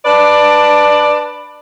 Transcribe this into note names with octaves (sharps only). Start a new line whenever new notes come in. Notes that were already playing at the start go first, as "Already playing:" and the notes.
D4 B4 D5